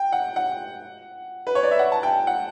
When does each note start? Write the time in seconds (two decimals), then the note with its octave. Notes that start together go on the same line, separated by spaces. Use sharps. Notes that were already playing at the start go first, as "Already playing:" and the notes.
Already playing: G5
0.12 F#5
0.36 F#5
1.47 B4
1.55 C#5
1.63 D5
1.71 E5
1.79 F#5
1.92 A5
2.03 G5
2.27 F#5